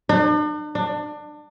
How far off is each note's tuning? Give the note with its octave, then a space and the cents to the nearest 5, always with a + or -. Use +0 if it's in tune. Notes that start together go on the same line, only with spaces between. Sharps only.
D4 +45
D4 +25